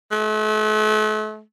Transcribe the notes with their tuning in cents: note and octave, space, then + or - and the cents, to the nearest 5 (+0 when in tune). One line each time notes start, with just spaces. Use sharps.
A3 -40